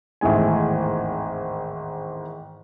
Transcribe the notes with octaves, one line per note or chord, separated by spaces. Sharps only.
G#1 E2 A2 G#3 G#5